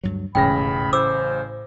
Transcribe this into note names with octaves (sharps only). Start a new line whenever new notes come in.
D2 G2 F#3
E1 A1 G#2 C#3 G5 B5 A#6
A2 C5 D6 E6